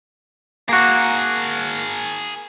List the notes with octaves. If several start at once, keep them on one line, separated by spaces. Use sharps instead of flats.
A#3 F#4 G#4 A#4